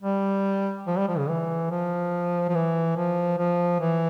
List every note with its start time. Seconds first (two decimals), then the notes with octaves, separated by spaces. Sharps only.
0.03 G3
0.87 F3
0.97 G3
1.08 F3
1.18 C#3
1.29 E3
1.70 F3
2.49 F3
2.55 E3
2.97 F3
3.38 F3
3.80 E3